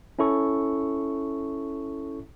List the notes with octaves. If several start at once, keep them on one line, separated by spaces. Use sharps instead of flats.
C#4 E4 A4 C#6